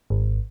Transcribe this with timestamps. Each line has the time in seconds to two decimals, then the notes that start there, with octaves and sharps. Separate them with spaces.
0.10 G#1